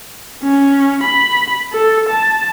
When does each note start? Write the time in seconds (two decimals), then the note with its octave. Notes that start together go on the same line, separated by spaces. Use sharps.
0.43 C#4
1.04 B5
1.73 A4
2.10 A5